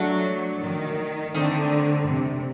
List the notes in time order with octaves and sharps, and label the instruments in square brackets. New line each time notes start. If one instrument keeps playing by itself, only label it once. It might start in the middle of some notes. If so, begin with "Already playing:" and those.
Already playing: [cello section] F#3 [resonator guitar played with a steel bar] A3 D4 F#4
[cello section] D#3
[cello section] D3 [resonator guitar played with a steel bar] D#3 A3 C4
[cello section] C3